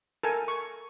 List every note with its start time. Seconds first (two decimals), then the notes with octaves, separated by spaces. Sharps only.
0.23 A4 A#4 G#5
0.48 C#6